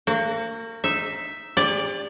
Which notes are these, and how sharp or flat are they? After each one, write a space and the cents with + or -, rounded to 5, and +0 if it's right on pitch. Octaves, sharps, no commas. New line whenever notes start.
A#3 -35 F#4 +10
D#4 +0 E5 +0
G4 +40 D5 +0